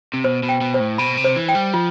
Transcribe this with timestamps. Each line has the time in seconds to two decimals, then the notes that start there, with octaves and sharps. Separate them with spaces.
0.14 C3
0.24 B2 C5
0.43 B2
0.49 G5
0.61 B2
0.74 C5
0.80 A2
0.98 B2 B5
1.17 C3
1.24 C5
1.36 E3
1.49 G5
1.55 G3
1.74 F3 F4